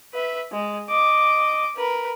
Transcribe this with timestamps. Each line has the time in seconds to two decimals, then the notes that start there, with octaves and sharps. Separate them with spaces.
0.13 B4 E5
0.52 G#3
0.89 D#5 D6
1.76 A#4 B4